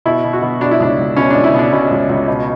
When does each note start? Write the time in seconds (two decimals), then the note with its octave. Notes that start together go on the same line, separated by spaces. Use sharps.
0.06 B2 E4
0.24 B2
0.33 F#4
0.42 B2
0.61 B2 D4
0.71 E4
0.80 C#2 D4
0.98 C#2
1.16 B2 C#4
1.30 C#2 D4
1.44 E4
1.54 B2 D4
1.72 B2 C#4
1.91 C#2
2.09 C#2
2.28 B2